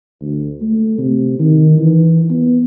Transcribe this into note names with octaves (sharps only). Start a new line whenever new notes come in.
D2
A3
C3
D#3
E3
B3